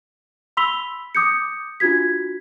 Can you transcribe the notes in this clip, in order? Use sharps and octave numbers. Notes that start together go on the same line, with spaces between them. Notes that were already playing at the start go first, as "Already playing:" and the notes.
B5 C6 E6 B6 F7 G7
D6 D#6 G6 C#7
D4 F4 F#4 G#6 B6